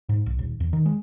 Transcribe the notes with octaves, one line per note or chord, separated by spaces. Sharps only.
G#2
B1
D#1
E2
D#3
G#3